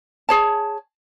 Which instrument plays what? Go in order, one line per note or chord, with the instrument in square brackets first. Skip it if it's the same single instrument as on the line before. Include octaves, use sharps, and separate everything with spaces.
[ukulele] G#4 C#5 A5